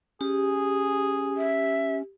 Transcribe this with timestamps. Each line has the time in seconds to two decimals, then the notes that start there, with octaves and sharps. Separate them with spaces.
0.21 C#4 G4 G#4
1.37 E5